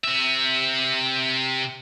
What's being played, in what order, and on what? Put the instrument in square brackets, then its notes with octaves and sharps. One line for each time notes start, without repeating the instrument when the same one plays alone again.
[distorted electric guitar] C3 E5